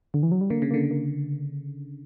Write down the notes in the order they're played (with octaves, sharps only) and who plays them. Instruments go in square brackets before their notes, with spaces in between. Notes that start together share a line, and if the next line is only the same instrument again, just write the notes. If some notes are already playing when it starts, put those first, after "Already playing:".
[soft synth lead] D3
E3
F#3
G3
[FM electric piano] D3 [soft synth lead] A#3
[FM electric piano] C#3
[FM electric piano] D3 [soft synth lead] A#3
[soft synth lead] A#3